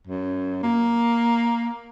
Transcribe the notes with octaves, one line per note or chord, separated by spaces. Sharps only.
F#2
A#3